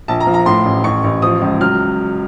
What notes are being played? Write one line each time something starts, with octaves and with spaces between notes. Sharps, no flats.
A#1 A5
A#5
F3
A#5
A2 C6
A1
A1 C#6
A1
F3 D#6
C#2
F#3 F6